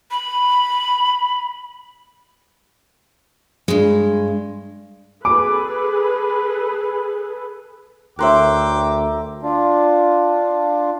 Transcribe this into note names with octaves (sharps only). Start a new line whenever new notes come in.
B5
G2 G#3
G#4 A4 B4 D6
D2 A#4 C#5 E5 G5 C6 D6 F#6
D4 F4